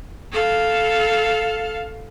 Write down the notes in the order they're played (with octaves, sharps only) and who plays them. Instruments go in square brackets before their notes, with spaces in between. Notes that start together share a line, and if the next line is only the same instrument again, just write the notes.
[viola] A4 F5